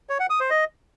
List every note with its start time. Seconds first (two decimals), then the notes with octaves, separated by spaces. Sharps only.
0.09 C#5
0.20 F#5
0.30 D#6
0.40 C5
0.50 D#5